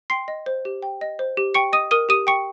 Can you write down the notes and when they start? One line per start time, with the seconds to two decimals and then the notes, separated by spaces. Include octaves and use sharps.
0.10 G5 C6 C7
0.28 D#5
0.46 C5
0.65 G4
0.82 G5
1.01 D#5
1.19 C5
1.37 G4
1.54 G5 C#6 C#7
1.73 D#5 D#6 D#7
1.91 A#4 D#6 D#7
2.09 G4 D#6 D#7
2.27 G5 C#6 C#7